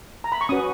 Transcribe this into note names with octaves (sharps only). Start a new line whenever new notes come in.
A#5
B5
C#6
C#4 F#4 B4 D#6